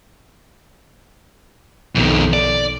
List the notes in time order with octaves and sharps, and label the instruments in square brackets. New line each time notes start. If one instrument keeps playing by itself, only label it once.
[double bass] B1 [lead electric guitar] F2 D#3
[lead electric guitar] D5